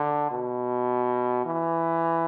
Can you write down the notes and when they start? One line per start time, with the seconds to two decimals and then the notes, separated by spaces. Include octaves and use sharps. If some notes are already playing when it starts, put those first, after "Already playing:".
Already playing: D3
0.31 B2
1.45 E3